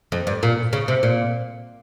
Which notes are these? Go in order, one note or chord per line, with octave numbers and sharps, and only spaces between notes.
F2
G2
A#2
C#3
C3
A#2